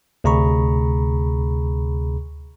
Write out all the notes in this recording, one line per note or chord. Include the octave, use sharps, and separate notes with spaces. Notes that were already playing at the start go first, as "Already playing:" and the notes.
D2 C3 G#4 A#5 B5 C#6